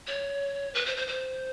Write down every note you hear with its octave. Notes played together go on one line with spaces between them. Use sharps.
C#5
B4
C5
C5
C5